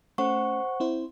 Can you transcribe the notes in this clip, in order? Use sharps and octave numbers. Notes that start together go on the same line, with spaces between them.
A3 C#4 C5 F#5 C#6
C4 E4 C5